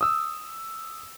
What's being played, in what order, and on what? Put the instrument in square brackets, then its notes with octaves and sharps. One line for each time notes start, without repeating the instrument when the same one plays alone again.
[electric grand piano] D#6 E6